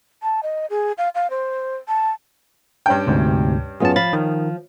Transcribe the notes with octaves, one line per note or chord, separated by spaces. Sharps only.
A5
D#5
G#4
F5
F5
C5
A5
G2 C#4 G5
D2 G#2 C3
F#2 B3 F4 G#4 A5
F3 F5 B5 A6
D#3